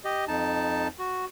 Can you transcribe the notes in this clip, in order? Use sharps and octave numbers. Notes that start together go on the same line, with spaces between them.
G4 D#5
F2 D#4 A5
F#4